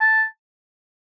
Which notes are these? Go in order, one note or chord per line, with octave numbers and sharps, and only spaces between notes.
A5